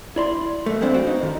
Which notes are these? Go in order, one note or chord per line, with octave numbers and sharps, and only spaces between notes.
E4 D5 C6
B2 A3
F3 G#3 B3 C4 D4
F#4 C5 F5 G5
D#4
D3 D#3 F3